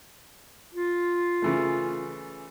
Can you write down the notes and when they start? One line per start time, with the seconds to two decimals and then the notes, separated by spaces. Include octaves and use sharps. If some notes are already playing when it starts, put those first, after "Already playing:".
0.75 F4
1.42 C#3 E3 A3